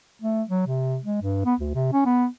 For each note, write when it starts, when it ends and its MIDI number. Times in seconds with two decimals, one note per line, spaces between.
0.22 0.43 57
0.49 0.63 54
0.67 0.99 48
1.05 1.21 56
1.22 1.43 43
1.45 1.55 59
1.60 1.72 38
1.75 1.92 48
1.93 2.05 61
2.06 2.27 59